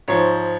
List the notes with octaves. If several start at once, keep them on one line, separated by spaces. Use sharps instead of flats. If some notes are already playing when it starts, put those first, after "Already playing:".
G#2 F3 C#5